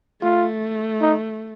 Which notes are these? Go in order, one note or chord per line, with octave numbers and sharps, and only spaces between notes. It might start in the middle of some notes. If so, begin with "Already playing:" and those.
A3 F4
D#4